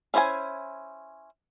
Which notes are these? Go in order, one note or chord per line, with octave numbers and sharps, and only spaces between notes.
C#4 E4 C5 D5 G#5